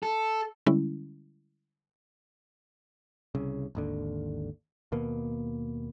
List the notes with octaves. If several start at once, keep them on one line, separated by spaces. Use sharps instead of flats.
A4
D3 G3 G#3 C#4 E4
C2 C#3
G#1 D#2 D3
D#2 B2 A#3 B3